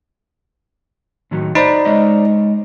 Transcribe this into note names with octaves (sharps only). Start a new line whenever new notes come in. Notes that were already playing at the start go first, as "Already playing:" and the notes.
A2 D#3 F#3
D#4 C5 D5 B5
G#3 C#5 D#5